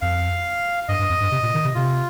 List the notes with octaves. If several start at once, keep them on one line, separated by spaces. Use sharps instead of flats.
F2 F5
G2 D#5
G2
F2
G2
C3
A#2
D#3
C3
C3 F4